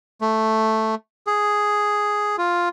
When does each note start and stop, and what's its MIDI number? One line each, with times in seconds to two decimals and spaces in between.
0.21 0.95 57
1.27 2.36 68
2.38 2.69 65